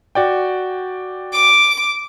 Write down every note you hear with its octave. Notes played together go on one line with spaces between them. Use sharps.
F#4 D5 G5
D6